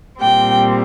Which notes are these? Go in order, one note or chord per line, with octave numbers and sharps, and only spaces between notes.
A#2 G3 C4 G5